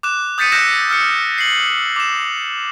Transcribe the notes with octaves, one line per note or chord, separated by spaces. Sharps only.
D6 F#6 E7
D#6 G6 A6 B6 C#7 D#7
E6 F#6 G6 A#6 C#7 E7
E6 F6 C#7
C7 F#7
D6 E7